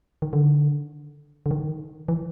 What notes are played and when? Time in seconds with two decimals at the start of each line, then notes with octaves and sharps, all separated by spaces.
0.22 D#3
0.33 D3
1.46 D3
1.51 D#3
2.08 E3